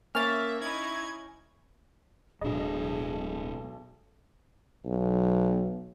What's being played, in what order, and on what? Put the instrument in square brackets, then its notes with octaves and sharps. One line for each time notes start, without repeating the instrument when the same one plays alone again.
[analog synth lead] A#3 [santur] C#4 [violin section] E5 [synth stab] F6 A6
[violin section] D#4 E4 [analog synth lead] G#6
[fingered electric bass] D1 D4 [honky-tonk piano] B1 D#5 [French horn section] G#3 B3 A4 [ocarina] G#4
[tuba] B1